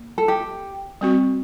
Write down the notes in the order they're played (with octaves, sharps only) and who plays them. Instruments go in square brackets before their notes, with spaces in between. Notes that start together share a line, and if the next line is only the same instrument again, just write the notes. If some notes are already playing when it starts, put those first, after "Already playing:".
Already playing: [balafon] A#3
[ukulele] A4
G4
[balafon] G3 C4 F#4